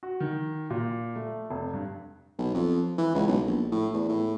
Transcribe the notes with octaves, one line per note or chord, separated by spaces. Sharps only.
F#4
D#3
A#2
A3
F1
G2
B1
F2
E3
C#2
B1
A#1
A2
E2
A2